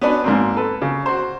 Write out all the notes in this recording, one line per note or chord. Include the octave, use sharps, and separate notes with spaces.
B3 C#4 D4 F#4 B4
G#2 A#3 C4
A4 B4
C#3
F#4 C5